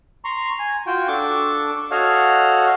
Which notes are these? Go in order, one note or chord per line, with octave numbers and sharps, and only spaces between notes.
A#5 C6 C#6
G#5
F4 F#4 G5
D4 A4 C#6 D6
F#4 A4 C#5 D#5 F5 F#5